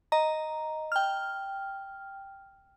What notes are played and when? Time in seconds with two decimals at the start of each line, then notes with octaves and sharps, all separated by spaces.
0.12 D#5 A#5
0.92 G5 F6